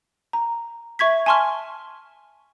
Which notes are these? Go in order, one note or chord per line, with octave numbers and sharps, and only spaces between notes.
A#5
E5 C#6 G#6 B6
G#5 A5 C6 C#6 F6